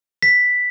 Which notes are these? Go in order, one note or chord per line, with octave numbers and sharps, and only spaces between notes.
B6